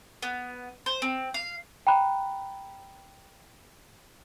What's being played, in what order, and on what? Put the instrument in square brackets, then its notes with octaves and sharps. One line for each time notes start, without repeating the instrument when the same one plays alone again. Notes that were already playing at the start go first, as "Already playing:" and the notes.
[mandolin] B3
C5
C4
F5
[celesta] G5 A#5 B5 F#6